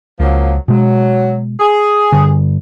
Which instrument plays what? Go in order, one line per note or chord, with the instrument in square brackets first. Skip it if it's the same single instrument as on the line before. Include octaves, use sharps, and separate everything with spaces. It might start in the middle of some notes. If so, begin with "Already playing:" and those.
[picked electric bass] C#2 [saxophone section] F3 F#3 A#3
[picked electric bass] B2 G#3 [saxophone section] F#3
[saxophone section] G#4
[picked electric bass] G2 D3